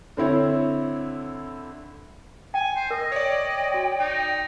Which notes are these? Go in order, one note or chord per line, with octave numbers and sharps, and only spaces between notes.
D3 C4 E4 C#5
G5 G#5
C5
A#4 D#5
C#5 D5 G5
F#4
D#4